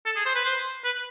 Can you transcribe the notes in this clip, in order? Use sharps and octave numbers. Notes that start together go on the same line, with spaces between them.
A4
G#4
C5
B4
C5
B4